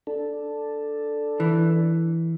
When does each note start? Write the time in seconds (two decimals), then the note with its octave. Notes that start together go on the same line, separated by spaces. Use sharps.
0.07 D4 A4
1.40 E3